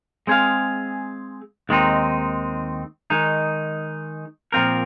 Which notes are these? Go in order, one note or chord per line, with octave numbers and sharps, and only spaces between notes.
G#3 C4 G#4 F5
D#2 D#3 G#3 C4 D#4
D#3 G#3 D#4
A#2 F3 C4 F4 A#4